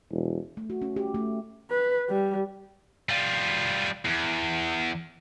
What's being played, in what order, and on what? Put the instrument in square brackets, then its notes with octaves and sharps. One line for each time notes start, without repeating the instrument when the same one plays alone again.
[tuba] E1
[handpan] A3
F#4
C#4
G4
A3
[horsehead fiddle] B4
G3
[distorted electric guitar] G3 F4
E2